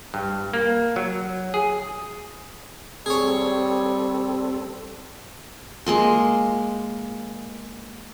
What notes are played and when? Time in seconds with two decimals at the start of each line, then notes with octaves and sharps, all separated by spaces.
0.14 G2
0.54 A#3
0.96 F#3
1.54 G#4
3.06 G3 C4 G#4 A4 C#5
5.86 G#3 A#3 C6